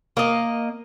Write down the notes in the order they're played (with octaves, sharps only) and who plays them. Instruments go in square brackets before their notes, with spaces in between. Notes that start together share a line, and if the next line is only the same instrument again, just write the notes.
[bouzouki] A#3 D#5